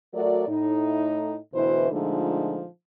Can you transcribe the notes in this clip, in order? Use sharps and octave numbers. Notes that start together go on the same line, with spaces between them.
F#3 A3 F#4 A#4 D5
A2 D#4
D2 B2 E3 E4 B4 C5
A#2 D3 F3 G#3 A3 D#4